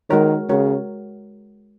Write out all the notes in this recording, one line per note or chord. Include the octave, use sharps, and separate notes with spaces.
D#3 G#3 F#4 A#4 C#5
C#3 G#3 F#4 A#4 C#5